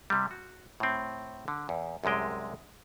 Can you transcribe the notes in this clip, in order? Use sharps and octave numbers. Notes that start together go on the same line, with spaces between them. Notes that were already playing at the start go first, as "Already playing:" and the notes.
C3 G3
F#4
A2 C4
D3
E2
C2 F#2 C3 G#3 G5